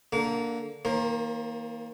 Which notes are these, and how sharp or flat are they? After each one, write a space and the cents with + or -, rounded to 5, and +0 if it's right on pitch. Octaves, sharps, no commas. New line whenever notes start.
D3 -10 A#3 +0 D6 -35
D#3 +40 A#3 +0 C5 +45